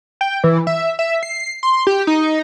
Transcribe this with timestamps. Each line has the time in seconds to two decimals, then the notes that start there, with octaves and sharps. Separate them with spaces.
0.21 G5
0.44 E3
0.67 E5
0.99 E5
1.23 C7
1.63 C6
1.87 G4
2.07 D#4